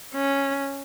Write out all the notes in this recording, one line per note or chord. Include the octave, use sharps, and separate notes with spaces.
C#4